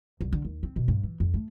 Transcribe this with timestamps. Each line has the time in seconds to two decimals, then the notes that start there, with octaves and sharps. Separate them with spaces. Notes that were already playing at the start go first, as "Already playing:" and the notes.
0.21 C2
0.33 D3
0.45 D#2
0.63 C4
0.76 B2
0.88 G2
1.03 E3
1.20 F2
1.34 A3